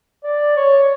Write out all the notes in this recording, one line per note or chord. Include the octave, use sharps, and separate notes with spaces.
D5
C#5